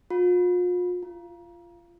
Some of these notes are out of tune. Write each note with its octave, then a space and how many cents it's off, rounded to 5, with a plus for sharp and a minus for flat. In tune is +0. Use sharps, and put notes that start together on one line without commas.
F4 +40
F4 -20